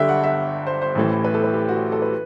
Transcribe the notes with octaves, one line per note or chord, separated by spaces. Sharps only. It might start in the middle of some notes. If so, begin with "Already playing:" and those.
Already playing: G1 G2 D3 E5 G5
F#5
E5
C5
C5
A1 A2 E3
B4
A4
B4
G4
F#4
A4
B4